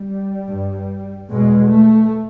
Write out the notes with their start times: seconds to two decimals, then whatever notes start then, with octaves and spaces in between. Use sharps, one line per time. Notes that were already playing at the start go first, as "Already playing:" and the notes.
Already playing: G3
0.48 G2
1.30 E2 B2 G#3
1.71 A3